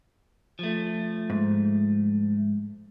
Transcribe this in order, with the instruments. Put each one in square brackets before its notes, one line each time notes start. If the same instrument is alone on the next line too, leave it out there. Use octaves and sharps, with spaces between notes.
[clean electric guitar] F3 A3
[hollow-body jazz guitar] G#2